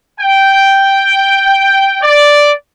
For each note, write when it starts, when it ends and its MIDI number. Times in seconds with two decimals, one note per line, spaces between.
0.20 1.96 79
2.02 2.52 74